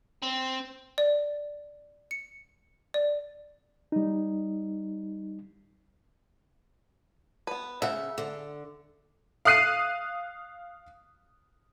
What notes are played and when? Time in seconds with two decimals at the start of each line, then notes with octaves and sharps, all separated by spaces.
0.23 C4
0.98 D5
2.11 C#7
2.94 D5
3.92 G3 D#4
7.47 B3 B4
7.82 C#3 E5 F#5
8.18 D3
9.45 F5 D#6 F#6 C7 D#7